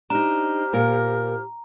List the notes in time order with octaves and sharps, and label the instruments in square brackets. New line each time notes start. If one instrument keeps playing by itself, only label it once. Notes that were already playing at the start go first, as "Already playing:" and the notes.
[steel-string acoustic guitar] D4 D#4 [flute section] G4 C5 F6 [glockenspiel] A#5
[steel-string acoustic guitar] A#2 A#4